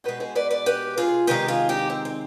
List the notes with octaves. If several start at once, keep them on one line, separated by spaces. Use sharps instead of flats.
B2 G#3 G4 B4
G#4 C5
B4 D5
B4 D5
G4 B4
F4 G#4
C3 D#3 G#3 G4 B4
F4 G#4
D#4 G4
C4
C4